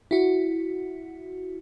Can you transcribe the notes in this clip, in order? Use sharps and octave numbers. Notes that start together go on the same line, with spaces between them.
E4 F#4